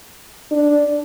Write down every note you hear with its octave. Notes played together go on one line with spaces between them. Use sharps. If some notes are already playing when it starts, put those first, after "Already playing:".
D4